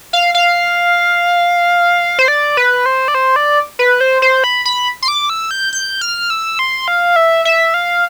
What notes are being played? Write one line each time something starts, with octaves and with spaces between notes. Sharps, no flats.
F5
F5
C5
D5
B4
C5
D5
C5
D5
B4
C5
C5
B5
B5
C6
D6
E6
G6
G6
F6
E6
C6
F5
E5
E5
F5